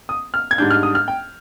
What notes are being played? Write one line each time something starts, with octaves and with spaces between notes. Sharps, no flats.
D#6
F6
G#6
G#2 G3 D4 G6
F6
D#6
F6
G5